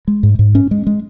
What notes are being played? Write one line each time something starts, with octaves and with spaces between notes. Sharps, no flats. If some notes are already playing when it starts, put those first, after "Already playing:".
G#3
G#2
G#2
C#4
G#3
G#3